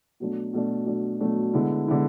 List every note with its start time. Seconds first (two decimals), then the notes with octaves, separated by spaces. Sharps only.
0.20 B2 F#3 A3 D4
0.53 B2 F#3 A3 D4
0.86 B2 F#3 A3 D4
1.20 B2 F#3 A3 D4
1.53 D3 G#3 B3 E4
1.88 D3 G#3 B3 E4